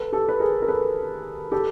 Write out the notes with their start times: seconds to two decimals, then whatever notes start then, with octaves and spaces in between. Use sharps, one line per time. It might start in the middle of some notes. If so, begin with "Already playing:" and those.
Already playing: A4 B4
0.12 G4 A4
0.29 B4
0.40 G#4 A#4
0.62 A#4
0.68 A4 B4
1.52 G4 A4